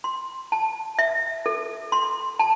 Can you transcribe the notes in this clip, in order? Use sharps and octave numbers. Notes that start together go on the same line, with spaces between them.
C6
A5
E5
A4
C6
A5